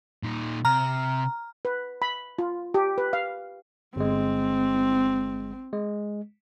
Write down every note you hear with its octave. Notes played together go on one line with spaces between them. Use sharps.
A#2 D#4
C3 A#5 F6
B4
B5
F4
G4
B4
F5
G1 G#3 C4
G#3